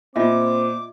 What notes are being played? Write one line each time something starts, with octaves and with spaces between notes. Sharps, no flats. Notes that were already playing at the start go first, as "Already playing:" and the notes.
A#2 C4 F4 D#5 E5 D6